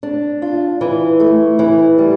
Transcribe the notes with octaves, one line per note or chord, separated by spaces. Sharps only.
D4
F4
E3
A3
E3
G3